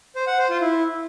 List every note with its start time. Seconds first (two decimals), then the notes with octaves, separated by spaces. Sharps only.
0.16 C5
0.27 F#5
0.38 C5
0.50 F4
0.61 E4